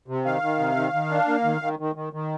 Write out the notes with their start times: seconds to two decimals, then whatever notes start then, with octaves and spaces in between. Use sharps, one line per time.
0.08 C3
0.25 D#3 F5
0.42 D#3
0.59 C3
0.76 D#3
0.93 D#3
1.11 D4
1.28 A#3
1.44 D#3
1.61 D#3
1.79 D#3
1.96 D#3
2.13 D#3